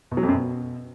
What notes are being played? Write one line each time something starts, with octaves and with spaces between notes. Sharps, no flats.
B2
F#3
F2
F#2
B2